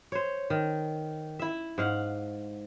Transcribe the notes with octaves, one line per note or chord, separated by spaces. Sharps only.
C5 C#5
D#3
E4 E5
G#2 F5 F#5